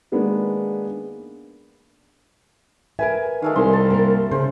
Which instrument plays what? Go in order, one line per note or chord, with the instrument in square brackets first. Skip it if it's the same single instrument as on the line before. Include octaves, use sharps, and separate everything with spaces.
[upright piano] D#3 G#3 A#3 B3 D4
[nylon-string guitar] A#4 B4 E5 [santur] G#5
[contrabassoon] D#3 [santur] G#3 A3 F5
[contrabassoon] C2 [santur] C6
[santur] A5
[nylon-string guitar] A#3 A#4
[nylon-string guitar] C#3 [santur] C5